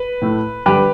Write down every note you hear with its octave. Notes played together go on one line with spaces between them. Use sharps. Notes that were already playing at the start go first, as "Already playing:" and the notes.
Already playing: B4
A2 A3
D3 G3 G4 B4